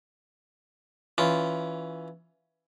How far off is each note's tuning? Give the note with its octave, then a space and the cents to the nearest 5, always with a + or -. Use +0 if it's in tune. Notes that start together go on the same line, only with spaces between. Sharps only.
E3 +0 C#4 +10 F4 +0